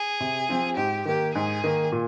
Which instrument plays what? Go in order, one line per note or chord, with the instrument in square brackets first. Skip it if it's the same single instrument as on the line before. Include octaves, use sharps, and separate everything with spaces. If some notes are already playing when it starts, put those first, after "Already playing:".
Already playing: [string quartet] G#4
[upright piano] C3
F3 C4 F4
[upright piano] G#2 [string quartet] G4
[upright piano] D#3 A#3 [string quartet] G4
[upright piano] G#2 [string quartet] G#4
[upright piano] D#3 A#3
A#2